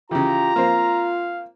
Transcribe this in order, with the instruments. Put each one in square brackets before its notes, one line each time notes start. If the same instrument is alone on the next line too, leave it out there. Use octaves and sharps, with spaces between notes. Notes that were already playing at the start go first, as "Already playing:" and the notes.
[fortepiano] C#3 E3 [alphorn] F4 [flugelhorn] G4 [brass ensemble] A#5
[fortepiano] A#3 C4 C5 [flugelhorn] F5